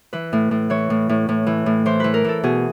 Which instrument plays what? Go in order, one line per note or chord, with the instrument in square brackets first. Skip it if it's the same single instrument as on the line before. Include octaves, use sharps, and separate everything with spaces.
[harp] E3 B4
A2
A2
E3 C#5
A2
A2
A2
E3
A2
E3 C5
E3 B4
A#4
E3 A4
B2 G#4